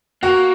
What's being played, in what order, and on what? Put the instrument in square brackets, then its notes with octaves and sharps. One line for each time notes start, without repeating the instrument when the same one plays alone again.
[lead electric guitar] A#3 [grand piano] F#4